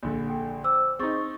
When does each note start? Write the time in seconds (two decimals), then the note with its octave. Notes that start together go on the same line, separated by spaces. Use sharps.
0.03 A#1 D3
0.28 A4 G5
0.64 C5 D6 E6
0.99 C4 D#4 G#4 C#6 A6